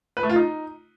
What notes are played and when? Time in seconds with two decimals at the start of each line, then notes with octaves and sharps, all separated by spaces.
0.17 B4
0.23 A3
0.29 F4
0.36 D#4